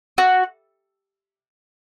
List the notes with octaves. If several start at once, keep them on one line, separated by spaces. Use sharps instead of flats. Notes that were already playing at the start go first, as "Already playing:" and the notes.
F#4